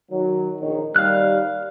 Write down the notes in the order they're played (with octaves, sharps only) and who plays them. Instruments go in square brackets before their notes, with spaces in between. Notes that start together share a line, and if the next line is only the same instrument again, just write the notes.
[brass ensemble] D#3 F#3
A#1 D#3 C#5
[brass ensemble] D#2 G3 [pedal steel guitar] F5 F6 F#6